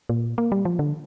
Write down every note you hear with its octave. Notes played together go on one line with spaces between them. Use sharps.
A#2
A#3
G3
F3
D3